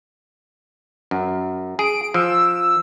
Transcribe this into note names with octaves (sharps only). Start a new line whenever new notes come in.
F#2
G#4 D7
F3 E6